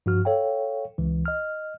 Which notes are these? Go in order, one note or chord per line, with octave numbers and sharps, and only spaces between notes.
G2 F3 F#4 F6
A4 C#5 F5 G5
C#2 E3
D#5 F6